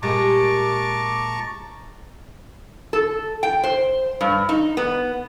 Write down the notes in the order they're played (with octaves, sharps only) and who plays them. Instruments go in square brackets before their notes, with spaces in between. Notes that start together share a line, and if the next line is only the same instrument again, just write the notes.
[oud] A#2 G#3 G4 [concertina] A5 A#5 C#6 [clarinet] D6
[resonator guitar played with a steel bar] A4
G5
C5
G2
D#4
B3